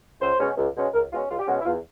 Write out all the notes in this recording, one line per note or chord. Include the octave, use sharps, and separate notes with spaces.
C#2 C5
B2 G#3 C#4
C#2
B2 G#3 C#4
C#2 A#4
B2 G#3 C#4 F4
C#2 F4
G4
B2 G#3 C#4 F#4
E4
E2 F4